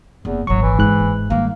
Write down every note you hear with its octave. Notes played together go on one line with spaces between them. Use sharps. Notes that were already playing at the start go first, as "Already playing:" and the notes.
F#1 E2
D#1 G#1 F#3 C#6
E3
G#2 F#6
G1
D#3 G3 A#3